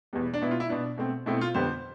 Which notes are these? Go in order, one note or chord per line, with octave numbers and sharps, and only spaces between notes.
E2 B2 G3 B3
D4
B2 B3 E4
F4
E4
B2 B3 D4
B2 A3 C4
B2 A3 C4 E4
F4
F2 D3 G3 B3 C5